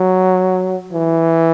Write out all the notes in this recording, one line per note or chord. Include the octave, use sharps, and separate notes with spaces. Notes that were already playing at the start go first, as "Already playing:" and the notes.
Already playing: F#3
E3